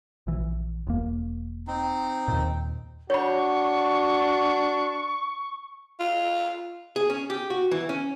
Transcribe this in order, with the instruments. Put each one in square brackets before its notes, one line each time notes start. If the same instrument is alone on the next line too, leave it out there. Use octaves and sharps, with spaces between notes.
[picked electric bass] A#1 E3
E1 A#3
[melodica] C4 D#4
[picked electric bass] D#2 A#2
[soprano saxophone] D4 [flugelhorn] F#4 [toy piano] C#5 B5 [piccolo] C#6
[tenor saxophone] F4
[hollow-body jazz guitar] G#4
C#4
G4
F#4
E3
C#4